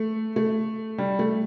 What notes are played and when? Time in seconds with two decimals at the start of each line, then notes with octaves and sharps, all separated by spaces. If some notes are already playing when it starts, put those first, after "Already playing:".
Already playing: A3
0.36 A3
0.98 G3
1.19 A3